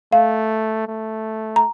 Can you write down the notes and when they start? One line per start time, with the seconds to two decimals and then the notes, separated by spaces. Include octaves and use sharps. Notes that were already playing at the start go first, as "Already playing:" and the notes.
0.12 A3 F5
0.88 A3
1.56 A#5